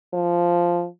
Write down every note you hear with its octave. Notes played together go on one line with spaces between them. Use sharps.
F3